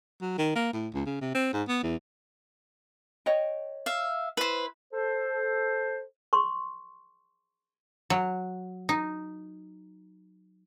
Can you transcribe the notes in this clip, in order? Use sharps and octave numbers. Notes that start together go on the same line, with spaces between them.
F#3
D#3
A#3
A2
C#2
C#3
C3
C4
G#2
B3
E2
C#5 D#5 G5
E5 F5
E4 B4 C5
A4 C5
C6 C#6
F#3
D#4